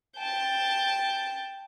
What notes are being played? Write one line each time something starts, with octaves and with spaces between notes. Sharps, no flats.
G5 A5